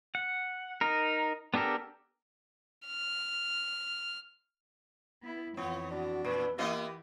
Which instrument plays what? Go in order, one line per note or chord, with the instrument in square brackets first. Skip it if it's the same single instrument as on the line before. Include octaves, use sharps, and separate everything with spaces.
[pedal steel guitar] F#5
D#4 A#4
B3 D4 G4 A4 A#4
[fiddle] F6
[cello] B3 E4
[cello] F2 E3 [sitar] B3 [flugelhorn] F4 [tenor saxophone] C#5
[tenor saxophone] D4 [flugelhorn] F#4
[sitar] A#2 [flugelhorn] B4
[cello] E3 [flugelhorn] A#3 [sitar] B3 E4 D#5 [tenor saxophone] G4